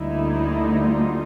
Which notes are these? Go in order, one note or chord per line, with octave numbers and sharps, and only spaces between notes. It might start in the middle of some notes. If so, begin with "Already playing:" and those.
Already playing: D2 D3 G3 A#3 D#4 E4
F4